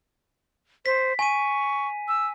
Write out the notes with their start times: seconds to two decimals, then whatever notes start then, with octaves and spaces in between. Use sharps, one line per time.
0.86 C5 B6
1.19 G#5 C#6 D#7
2.08 E6